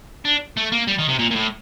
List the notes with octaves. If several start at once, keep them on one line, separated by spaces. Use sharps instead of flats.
D4
A3
A#3
G3
D#3
C3
A#2
A#2
A2